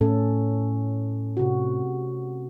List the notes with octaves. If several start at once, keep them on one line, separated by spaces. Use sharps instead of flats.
A2 A3 C#4 A4
C3 F#4